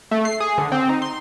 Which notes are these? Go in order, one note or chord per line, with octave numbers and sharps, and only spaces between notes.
A3
C7
G#4
D3
C4
D#4
C6